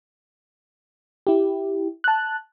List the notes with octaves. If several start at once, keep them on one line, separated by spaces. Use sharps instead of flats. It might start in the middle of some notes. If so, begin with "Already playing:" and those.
E4 G4
A5 F#6